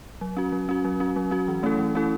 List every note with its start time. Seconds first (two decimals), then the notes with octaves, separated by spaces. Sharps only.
0.21 F#3
0.37 C#4 F#4
0.52 F#3
0.69 C#4 F#4
0.84 F#3
1.00 C#4 F#4
1.16 F#3
1.31 C#4 F#4
1.48 E3
1.63 A3 C#4 E4 A4
1.79 E3
1.95 A3 C#4 E4 A4